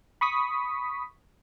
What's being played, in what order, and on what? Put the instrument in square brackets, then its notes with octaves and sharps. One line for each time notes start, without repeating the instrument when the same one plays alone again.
[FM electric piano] B5 C#6 D#6 B6